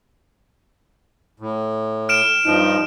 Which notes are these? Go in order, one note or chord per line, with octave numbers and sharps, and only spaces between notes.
A2
F6 D7 E7
G2 F3 D#4